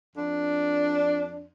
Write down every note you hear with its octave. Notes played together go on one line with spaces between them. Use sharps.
F2 D4